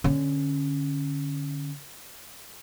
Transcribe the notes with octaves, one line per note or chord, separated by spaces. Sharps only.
D3 C#4